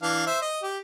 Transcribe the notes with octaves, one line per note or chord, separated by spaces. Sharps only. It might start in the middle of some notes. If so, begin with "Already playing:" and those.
E3 D4 F5
C5 E5
D#5
G4